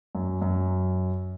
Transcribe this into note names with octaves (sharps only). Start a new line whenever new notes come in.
F#2
F#2